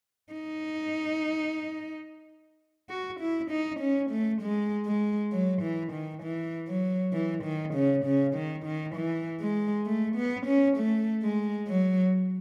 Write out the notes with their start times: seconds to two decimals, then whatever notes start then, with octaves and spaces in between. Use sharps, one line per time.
0.33 D#4
2.89 F#4
3.20 E4
3.51 D#4
3.80 C#4
4.11 A3
4.42 G#3
4.86 G#3
5.33 F#3
5.62 E3
5.93 D#3
6.23 E3
6.68 F#3
7.13 E3
7.44 D#3
7.74 C#3
8.05 C#3
8.34 D#3
8.65 D#3
8.95 E3
9.41 G#3
9.87 A3
10.16 B3
10.47 C#4
10.78 A3
11.23 G#3
11.67 F#3